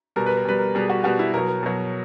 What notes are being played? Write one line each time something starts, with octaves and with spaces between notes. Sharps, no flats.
B2 G3 A#4
B4
A#4
B2 G3 B4
A#4
B2 G3 G#4
F#4
B2 G3 F#4
E4
B2 F#3 A#4
A#4
B2 F#3